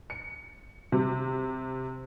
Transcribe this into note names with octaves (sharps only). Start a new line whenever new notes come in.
C#7
C3